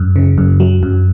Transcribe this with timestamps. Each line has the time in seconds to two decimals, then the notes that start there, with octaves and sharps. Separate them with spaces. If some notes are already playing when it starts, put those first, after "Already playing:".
Already playing: F#2
0.16 C#3
0.38 F#2
0.60 F#3
0.83 F#2